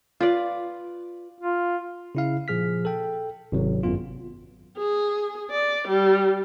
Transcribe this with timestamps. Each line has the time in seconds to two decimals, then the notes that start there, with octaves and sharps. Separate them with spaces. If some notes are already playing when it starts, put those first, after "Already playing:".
0.20 F4 B4 D5
1.40 F4
2.15 C#3 E4 F5
2.48 A#2 F3 G#4 F6 B6
2.85 A4 G5
3.52 G#1 C3 F#3
3.83 G#1 F#2 B3 F4
4.77 G#4
5.51 D5
5.88 G3